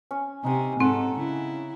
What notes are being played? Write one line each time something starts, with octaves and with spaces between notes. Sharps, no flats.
C#4
C3 D#4 G#5
G#2 C4 A4 F#5
C#3 E4